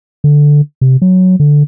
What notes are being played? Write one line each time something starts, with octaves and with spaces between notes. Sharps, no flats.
D3
C3
F#3
D3